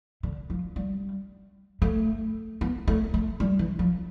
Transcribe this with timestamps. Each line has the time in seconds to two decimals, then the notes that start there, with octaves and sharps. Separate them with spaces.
0.23 D3
0.50 F3
0.76 G3
1.82 A3
2.61 B3
2.88 A3
3.14 A3
3.40 G3
3.59 E3
3.79 F3